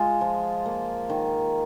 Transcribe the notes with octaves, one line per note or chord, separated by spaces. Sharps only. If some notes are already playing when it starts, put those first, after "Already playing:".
Already playing: G#3 F4
F3
A#3
D#3